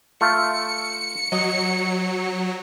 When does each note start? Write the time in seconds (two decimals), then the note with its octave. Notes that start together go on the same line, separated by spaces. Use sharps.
0.21 A3 F4 C#7
1.32 F#3 D#5